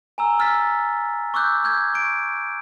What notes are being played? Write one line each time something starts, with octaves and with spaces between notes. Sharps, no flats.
G#5 A#5 E6
E6 F6 A6 B6
C#6 D6 E6 F#6 G6
F6 G6 G#6
C#6 D7